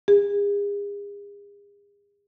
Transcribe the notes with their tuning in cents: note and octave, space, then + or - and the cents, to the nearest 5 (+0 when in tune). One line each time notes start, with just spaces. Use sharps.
G#4 -40